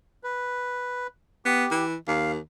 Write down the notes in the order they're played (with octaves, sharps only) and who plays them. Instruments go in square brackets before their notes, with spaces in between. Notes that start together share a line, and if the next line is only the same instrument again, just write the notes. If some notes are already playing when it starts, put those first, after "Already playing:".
[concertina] B4
[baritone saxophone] B3 [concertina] G4
[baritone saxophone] E3
[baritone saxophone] D#2 [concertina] F5